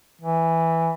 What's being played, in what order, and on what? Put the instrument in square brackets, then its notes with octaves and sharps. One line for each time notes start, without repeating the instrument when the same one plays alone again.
[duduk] E3